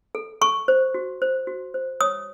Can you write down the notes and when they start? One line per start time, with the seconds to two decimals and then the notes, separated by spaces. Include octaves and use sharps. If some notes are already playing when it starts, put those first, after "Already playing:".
0.15 A4
0.41 A4 C#6
0.68 C5
0.94 F#4
1.22 C5
1.47 F#4
1.74 C5
2.01 C#5 D#6